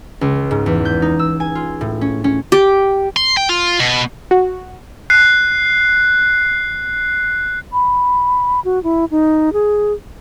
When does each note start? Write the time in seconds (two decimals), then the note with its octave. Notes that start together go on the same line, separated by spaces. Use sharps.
0.21 C#2
0.51 G#2
0.66 E2
0.85 G6
1.02 D#4
1.19 E6
1.40 G#5
1.55 F4
1.81 A2
2.01 C#4
2.24 C#4
2.52 G4
3.17 C6
3.37 G5
3.49 F4
3.80 B2
4.31 F#4
5.10 F#6 C7
7.73 B5
8.65 F#4
8.84 E4
9.11 D#4
9.53 G#4